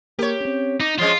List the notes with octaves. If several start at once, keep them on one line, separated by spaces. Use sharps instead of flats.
A#3 G4 A#4 C#5
C4 C#4
D#4 D6
F3 G#3 C#4 F4